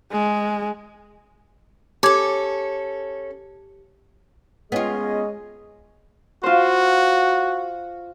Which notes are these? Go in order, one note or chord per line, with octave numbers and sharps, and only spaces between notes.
G#3
C#4 G4 A4 A5 D6 G#6
G#3 B3 C#4 F4 G#4 D#5
F4 F#4 C5